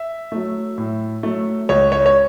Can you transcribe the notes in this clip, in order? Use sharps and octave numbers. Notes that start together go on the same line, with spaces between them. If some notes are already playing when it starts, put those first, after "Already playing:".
Already playing: E5
F#3 A3
A2
F#3 A3
C#2 C#5
C#5
C#5